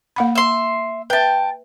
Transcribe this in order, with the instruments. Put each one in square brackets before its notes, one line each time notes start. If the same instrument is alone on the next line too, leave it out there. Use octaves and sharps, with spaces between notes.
[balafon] A#3 F#5 B5
[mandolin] E5 C6
[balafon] B4 E5 [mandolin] G5 A5